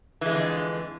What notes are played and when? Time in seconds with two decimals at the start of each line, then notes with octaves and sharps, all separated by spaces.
0.21 E3
0.26 G#3
0.30 D3
0.34 F2